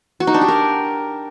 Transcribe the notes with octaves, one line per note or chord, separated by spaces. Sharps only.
F#4
D#4
D4
G4
A#4